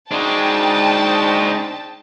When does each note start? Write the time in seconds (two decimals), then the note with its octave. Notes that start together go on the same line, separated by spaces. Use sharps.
0.11 G#3 D4 D#4 F#4 C5 G5 A5